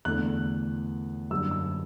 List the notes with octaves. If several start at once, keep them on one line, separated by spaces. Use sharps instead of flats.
E2 D3 A3 F#6
F#2 D3 G3 E6
E6